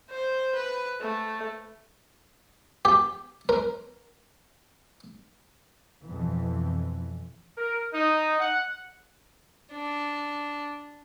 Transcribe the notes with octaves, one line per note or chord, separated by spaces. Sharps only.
C5
B4
A3
G4
A#4
F2 B2 E3
A#4
D#4
F#5
D4